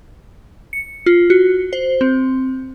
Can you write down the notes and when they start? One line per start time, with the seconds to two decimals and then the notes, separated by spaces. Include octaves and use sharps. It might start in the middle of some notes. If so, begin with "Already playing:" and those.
0.73 C#7
1.06 F4
1.30 F#4
1.73 C5
2.01 C4